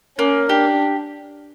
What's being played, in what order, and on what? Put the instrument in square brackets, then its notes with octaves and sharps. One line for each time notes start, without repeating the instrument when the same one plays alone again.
[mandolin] A#3 [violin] C#4
[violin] D4 [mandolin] G4